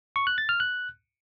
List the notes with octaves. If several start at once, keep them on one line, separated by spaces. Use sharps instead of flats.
C#6
F#6
A6
F6
F#6